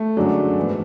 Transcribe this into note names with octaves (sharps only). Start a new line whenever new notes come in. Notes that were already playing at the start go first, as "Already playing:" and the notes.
Already playing: A3
F#2 D3 F#3 G#3 D4
G#2 E3 B3